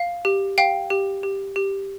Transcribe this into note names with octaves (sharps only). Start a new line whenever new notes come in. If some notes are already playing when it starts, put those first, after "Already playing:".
Already playing: F5
G4
F5 G5
G4
G4
G4